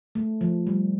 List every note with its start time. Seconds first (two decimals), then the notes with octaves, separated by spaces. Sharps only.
0.15 A3
0.41 F3
0.67 G3